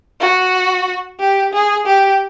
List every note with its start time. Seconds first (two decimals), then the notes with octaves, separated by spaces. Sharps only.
0.20 F#4
1.20 G4
1.53 G#4
1.86 G4